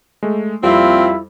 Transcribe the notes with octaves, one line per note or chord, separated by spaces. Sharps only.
G#3 A3
F2 A#2 G3 C4 E4 F4